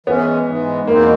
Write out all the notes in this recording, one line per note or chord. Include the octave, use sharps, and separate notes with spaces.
E3 G#3 B3 C#4
G#2 E3 G#3
E2 B2 G#3 A#3 C4 D#4